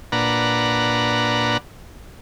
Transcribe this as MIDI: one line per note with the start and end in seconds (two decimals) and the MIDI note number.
0.12 1.57 46
0.12 1.57 62
0.12 1.57 71
0.12 1.57 78
0.12 1.57 82